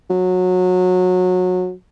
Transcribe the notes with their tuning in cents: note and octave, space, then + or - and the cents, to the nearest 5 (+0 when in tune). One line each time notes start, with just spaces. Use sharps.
F#3 -20